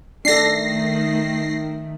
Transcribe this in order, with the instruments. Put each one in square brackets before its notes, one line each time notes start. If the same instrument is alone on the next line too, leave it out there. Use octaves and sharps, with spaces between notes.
[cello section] D#3 A3 [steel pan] D4 A4 [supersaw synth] A#6 C7